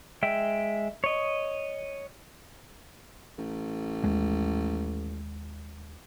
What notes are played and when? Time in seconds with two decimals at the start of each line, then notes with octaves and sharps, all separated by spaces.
0.23 G#3 E5 G5
1.04 C#5 D#5
3.38 A1
4.04 D#2 G#3